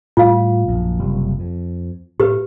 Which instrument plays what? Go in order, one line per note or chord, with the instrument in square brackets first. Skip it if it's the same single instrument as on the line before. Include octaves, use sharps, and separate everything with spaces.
[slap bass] A2 G3 [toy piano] F4 F5
[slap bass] A#1 F#2
F#1 C3 G3
F2
[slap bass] A2 [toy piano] G4 B4